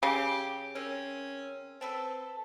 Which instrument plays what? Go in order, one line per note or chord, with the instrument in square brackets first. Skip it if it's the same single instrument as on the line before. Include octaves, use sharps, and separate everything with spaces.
[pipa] C#3 [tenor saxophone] G4
[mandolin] C4 A#4 [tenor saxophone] C#4
[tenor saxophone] C4 [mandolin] A4 B4 A5